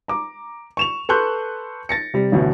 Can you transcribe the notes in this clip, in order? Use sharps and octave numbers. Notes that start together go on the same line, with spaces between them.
A#5 D6
C#6 E7 F7
A4 B4 C6 C#6 F#6 G6
A6 A#6 C#7
C3 G3
A1 D2 B2